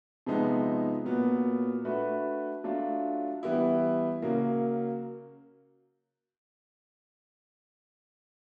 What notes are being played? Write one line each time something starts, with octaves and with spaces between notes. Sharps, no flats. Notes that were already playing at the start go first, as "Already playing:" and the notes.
C3 F3 G#3 B3 D#4
A#2 F#3 B3
A3 D4 F#4 B4
F#3 A3 D4 F4
E3 G3 B3 E4
C#3 F#3 A#3